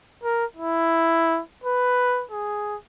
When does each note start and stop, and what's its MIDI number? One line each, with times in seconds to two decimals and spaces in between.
0.24 0.45 70
0.57 1.41 64
1.64 2.24 71
2.31 2.76 68